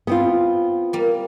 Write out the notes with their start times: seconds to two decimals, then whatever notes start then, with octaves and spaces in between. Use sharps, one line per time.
0.07 B3 C4 F4
0.93 G3 A#3